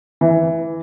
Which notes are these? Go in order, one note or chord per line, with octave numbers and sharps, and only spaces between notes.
E3